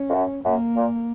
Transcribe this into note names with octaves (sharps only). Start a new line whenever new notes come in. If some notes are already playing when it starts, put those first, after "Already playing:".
Already playing: C#4
F2
F#2
F#2 A#3
A#2